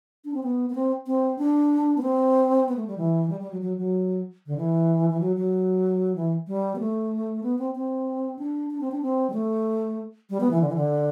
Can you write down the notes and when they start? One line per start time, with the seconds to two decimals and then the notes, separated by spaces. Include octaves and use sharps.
0.25 D4
0.34 C4
0.43 B3
0.70 B3
0.75 C4
1.07 C4
1.38 D4
1.98 B3
2.02 C4
2.69 B3
2.76 A3
2.87 G3
2.98 E3
3.30 G3
3.40 G3
3.51 F#3
3.61 F#3
3.78 F#3
4.46 D3
4.57 E3
5.10 E3
5.20 F#3
5.36 F#3
6.16 E3
6.48 G3
6.75 B3
6.80 A3
7.43 B3
7.59 C4
7.75 C4
8.39 D4
8.70 D4
8.81 C4
8.91 D4
9.02 C4
9.30 G3
9.33 A3
10.30 G3
10.40 B3
10.51 E3
10.61 D3
10.69 E3
10.76 D3